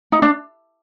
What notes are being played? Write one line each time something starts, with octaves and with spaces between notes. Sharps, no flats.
D#4
D4